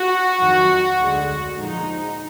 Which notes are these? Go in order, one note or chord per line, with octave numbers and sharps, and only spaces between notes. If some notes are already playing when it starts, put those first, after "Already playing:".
Already playing: F#4
F2 D#3 F#3
D2 D3 G#3
A#2 F3 G#3 D#4